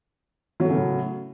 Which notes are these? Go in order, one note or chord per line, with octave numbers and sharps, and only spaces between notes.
A2 C#3 F#3 A3